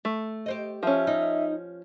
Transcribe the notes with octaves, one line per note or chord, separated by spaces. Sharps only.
A3
G4 C5 D#5
F3 C#4 E5
D#4